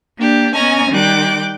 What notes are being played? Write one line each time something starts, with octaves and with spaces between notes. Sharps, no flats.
A#3 D4 G4
B3 C#4 D#5 G#5 A#5
D#3 G3 G5 D6 F#6